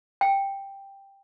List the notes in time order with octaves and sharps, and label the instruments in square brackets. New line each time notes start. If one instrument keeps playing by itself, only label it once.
[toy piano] G5